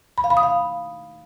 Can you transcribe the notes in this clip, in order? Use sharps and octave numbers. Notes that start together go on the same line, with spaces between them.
B5
F5
B5
D#6
F5